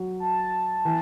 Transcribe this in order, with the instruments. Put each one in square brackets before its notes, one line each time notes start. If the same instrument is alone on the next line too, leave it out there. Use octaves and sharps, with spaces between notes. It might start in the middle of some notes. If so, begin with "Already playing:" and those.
Already playing: [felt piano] F#3
[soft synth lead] A5
[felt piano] E3